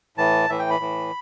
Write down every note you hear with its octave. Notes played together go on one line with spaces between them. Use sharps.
A2 E3 A5
A2 E3 E5
G5
B5
A2 E3